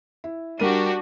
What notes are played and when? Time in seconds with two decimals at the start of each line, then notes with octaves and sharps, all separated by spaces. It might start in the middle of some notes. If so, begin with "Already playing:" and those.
0.24 E4
0.60 G3 D4 F#4 G4 A#4 D#7